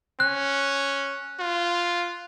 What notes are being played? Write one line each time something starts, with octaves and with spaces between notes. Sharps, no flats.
C#4 F#6
F4